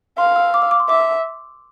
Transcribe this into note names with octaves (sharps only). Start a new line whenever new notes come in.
F5 C6
E6
D6
E6
D6
C6
E5 D6
E6